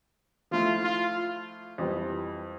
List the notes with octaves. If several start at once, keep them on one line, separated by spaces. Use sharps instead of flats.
F3 A3 E4 F4
F4
F2 E3 G3